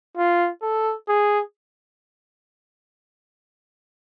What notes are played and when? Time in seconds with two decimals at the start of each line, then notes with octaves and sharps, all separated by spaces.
0.17 F4
0.62 A4
1.09 G#4